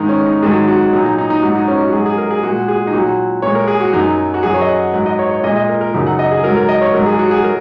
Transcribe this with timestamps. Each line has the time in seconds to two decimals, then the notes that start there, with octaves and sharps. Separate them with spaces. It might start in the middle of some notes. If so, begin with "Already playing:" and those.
Already playing: G#2 D#3 G#3 D#4
0.09 C#4
0.26 D#4
0.42 G#2 D#3 F#3 G#4
0.68 F#4
0.93 A#2 F#3 D#4
1.05 D#4
1.18 D#4
1.30 D#4
1.43 G#2 F#3 F#4
1.55 D#4
1.68 C#4
1.80 F#4
1.93 G#2 F#3 G#4
2.06 G#4
2.18 A#4
2.31 G#4
2.43 A#2 G#3 F#4
2.68 G#4
2.87 D#4
2.93 A#2 F#3 F#4
3.42 A#2 G#3 C#5
3.55 A#4
3.68 G#4
3.81 F#4
3.93 F#2 F#3 D#4
4.34 F#4
4.43 F#2 F#3 G#4
4.54 C#5
4.61 D#5
4.69 F#5
4.93 G#2 F#3 F#5
5.06 D#5
5.19 C#5
5.31 C#5
5.43 A#2 D#5
5.48 G#3
5.57 D#5
5.69 A#4
5.81 A#4
5.94 F#2 C#3 F#3 D#4
6.06 F#5
6.19 D#5
6.31 G#4
6.44 G#2 F#3 A#4
6.57 A#4
6.69 D#5
6.81 C#5
6.94 G#2 F#3 A#4
7.06 G#4
7.19 F#4
7.31 G#4
7.44 F#3 A#4